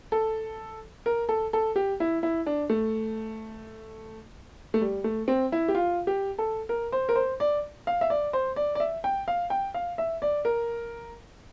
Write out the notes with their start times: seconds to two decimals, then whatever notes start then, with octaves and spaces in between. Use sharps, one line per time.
0.12 A4
1.06 A#4
1.29 A4
1.53 A4
1.76 G4
2.00 E4
2.23 E4
2.47 D4
2.70 A3
4.74 A3
4.81 G3
5.04 A3
5.28 C4
5.52 E4
5.68 G4
5.75 F4
6.07 G4
6.38 A4
6.69 A#4
6.92 C5
7.09 A#4
7.16 C5
7.40 D5
7.87 F5
8.01 E5
8.10 D5
8.33 C5
8.56 D5
8.75 D5
8.80 E5
9.04 G5
9.28 F5
9.50 G5
9.74 F5
9.98 E5
10.22 D5
10.45 A#4